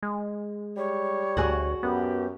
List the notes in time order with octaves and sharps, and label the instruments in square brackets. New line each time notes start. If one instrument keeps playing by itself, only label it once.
[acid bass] G#3
[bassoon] G3 [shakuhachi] C#5
[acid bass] D2 [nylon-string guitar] F#4 G#4 G#5
[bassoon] F#2 [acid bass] B3 [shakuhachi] G4